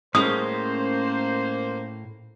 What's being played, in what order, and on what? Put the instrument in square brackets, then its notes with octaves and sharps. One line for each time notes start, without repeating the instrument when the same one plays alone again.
[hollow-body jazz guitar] A2 G#3 [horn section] A#3 C5 [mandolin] C#4 [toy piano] D#6